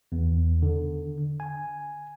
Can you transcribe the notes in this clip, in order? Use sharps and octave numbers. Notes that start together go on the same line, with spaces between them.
E2
D3
G#5